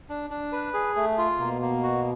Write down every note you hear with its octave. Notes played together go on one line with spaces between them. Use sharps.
D4
D4
B4
G#4
A3
F4
B2 A#3
A#3
F#4